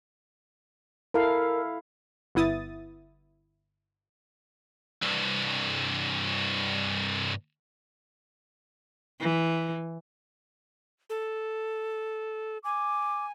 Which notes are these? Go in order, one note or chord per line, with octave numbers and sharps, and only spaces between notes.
E4 A4 A#4 F5
G1 B3 E4 D#6 A6
C2 G2
E3
A4
G#5 D6